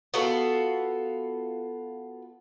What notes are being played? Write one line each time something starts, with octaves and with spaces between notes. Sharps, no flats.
B3 F4 F#4 A4